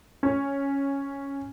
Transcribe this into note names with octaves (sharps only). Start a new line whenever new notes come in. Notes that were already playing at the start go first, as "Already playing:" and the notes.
C#4